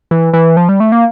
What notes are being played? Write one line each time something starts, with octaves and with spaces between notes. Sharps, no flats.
E3
E3
F3
G3
A3
A#3